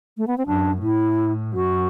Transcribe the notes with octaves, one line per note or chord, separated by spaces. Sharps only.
A3
B3
C4
F#2 D4
A2 E4
F#2 F#4